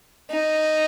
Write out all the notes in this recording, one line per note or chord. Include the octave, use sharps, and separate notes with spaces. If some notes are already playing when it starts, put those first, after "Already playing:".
D#4